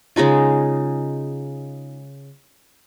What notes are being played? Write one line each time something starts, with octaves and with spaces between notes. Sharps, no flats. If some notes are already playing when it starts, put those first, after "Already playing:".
C#3 G#3 D#4 F4